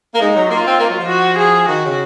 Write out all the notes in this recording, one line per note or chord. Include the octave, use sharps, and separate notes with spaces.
A#3
G#3 D#4
F#3
A#3 F4
C4
A#3
F#3
F3
F#4
G#4
D#3 F#4
C#3